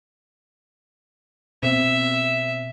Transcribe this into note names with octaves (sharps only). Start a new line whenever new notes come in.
B2 C4 E5